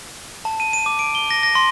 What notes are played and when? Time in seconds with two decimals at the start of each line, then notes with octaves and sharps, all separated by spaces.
0.45 A5
0.60 D#7
0.73 D#7
0.86 D6
0.99 D7
1.15 G7
1.31 A#6
1.43 A#6
1.55 C6